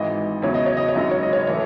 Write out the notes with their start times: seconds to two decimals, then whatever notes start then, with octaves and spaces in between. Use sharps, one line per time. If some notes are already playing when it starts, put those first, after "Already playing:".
Already playing: G#1 G#2 E3 D#5
0.42 E2 C#3 F#3 C#5
0.54 D#5
0.66 C#5
0.77 D#5
0.89 C#5
0.95 G#1 F#2 C#3 F#3 D#5
1.11 C#5
1.23 D#5
1.33 C#5
1.47 A2 E3 C#5